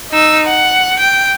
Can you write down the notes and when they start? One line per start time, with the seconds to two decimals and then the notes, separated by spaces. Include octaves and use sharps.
0.11 D#4 E6
0.47 F#5
0.99 G5